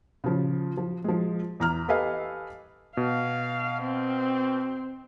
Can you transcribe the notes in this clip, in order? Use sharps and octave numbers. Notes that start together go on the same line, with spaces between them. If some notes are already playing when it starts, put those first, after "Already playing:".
C#3 F3
F3
F3 G#3
E2 A#5 F6
G4 A4 B4 D#5 F5 G#5
B2 F5
C4